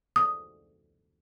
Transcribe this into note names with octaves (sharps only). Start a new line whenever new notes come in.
D#6